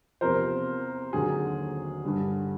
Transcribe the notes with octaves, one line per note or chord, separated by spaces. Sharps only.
E2 C3 F3 A#4 C5
D#2 D3 F#3 G#4
G2 D3 G3